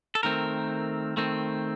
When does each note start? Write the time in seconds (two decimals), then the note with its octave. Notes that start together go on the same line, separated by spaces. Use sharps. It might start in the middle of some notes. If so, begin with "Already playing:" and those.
0.15 A4
0.23 D#3 A3 C4 A#4
1.17 D#3 A3 C4